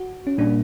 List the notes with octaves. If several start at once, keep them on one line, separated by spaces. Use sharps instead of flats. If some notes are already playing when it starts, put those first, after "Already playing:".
Already playing: F#4
C#4
A#2 G3 A#3 D4